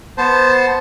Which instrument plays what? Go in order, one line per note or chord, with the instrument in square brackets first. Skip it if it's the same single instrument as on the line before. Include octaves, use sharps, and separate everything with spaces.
[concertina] B3 C5 A5